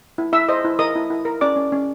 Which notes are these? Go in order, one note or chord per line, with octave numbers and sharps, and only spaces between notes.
E4
E4 E5 E6
C5 D#5 D#6
E4
A#4 D#5 D#6
E4
E4
A#4
C#4 D5 D6
C#4
C#4